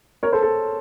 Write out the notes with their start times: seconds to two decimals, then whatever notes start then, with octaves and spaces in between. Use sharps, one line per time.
0.23 A#4 C#5
0.32 A4 C5
0.43 A4